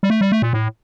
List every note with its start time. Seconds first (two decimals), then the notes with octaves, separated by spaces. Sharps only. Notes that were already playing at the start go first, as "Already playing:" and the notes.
0.03 G3
0.10 A3
0.21 G3
0.32 A3
0.42 A#2
0.53 A2